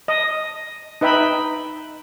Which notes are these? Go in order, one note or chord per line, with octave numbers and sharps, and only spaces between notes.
D#5
D#4 B4 E5 G5 B5